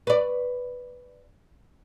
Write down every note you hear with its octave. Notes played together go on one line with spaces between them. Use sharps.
B4 D5